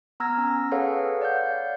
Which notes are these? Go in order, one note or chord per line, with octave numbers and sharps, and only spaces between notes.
B3 A#5 E6 F6 G#6 A#6
C#4
G#4 A4 B4 C#5 F5 F#5
D5 F5 F#5 G6